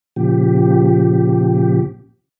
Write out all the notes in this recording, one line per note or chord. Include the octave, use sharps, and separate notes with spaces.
A#2 C#3 F3 G4